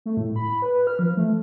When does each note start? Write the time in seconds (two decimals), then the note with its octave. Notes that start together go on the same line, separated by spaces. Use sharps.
0.06 A3
0.17 A2
0.36 B5
0.62 B4
0.87 F6
0.99 F3
1.17 A3